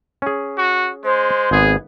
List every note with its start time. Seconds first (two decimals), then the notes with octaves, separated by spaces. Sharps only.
0.22 C#4 G#4
0.58 F#4
1.04 G#3 C5
1.51 G#1 B3 G#4